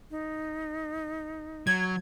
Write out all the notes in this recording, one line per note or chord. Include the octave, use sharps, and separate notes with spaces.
D#4
F#3 G#6